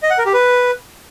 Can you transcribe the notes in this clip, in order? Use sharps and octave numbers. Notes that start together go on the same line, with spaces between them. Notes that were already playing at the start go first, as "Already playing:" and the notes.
D#5
F#5
A#4
G4
B4